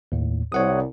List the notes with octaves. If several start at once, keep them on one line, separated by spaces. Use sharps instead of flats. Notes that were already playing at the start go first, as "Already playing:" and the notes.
D#2 A2
C2 C#5 F#5 D#6